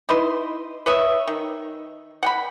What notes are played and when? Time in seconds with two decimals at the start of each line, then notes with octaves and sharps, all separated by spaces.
0.09 D#4 E4 B4 C6
0.86 B4 C#5 D#5 E5
1.27 D#3
2.23 F#5 G5 B5